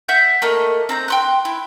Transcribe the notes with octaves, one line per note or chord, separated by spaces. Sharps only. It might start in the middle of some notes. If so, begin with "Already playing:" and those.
E5 F#5 F#6 G6
A3 A#3 D#5
C4 A#5 G6
G5 C6 F#6
E4